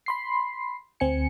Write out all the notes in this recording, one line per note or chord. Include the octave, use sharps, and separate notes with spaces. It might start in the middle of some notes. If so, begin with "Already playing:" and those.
B5 C6 C7
D2 C4 G#5 C#7